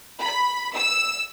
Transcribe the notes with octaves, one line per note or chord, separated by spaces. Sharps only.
B5
E6